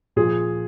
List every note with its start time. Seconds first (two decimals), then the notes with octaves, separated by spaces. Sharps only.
0.16 A#2 F3 G#4